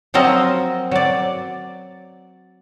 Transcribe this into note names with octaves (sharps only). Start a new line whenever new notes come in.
F3 F#3 C4 A#4 D#5
F#3 D5